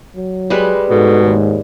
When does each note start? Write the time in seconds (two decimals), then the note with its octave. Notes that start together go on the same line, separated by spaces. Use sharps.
0.16 F#3
0.50 G3 G#3 B4
0.90 G#2 B2 A4
1.24 D#2